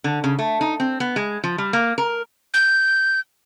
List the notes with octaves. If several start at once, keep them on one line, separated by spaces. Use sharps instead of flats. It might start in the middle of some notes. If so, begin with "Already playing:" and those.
D3
C#3
A3
D#4
C4
B3
G#3
F3
G3
A#3
A#4
G6